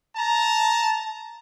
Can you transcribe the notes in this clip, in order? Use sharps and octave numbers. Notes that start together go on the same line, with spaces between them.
A5 A#5